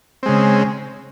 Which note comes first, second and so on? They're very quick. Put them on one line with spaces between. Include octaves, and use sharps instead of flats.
C4 G#3 C#3